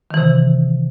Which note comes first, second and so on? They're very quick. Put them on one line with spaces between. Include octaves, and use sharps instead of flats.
D#3 E3 C3